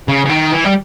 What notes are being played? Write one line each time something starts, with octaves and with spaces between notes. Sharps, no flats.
C#3
C#3
D#3
E3
G3